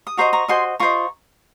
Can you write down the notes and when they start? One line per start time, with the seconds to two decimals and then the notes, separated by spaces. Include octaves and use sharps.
0.07 D#6
0.17 F#4 C5 D#5 A#5 C#6
0.33 A#5 C#6
0.48 F#4 C5 D#5 G#5 C6
0.80 F4 C5 D#5 A#5 C#6